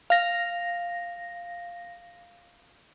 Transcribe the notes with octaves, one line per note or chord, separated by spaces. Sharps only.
F5 A#6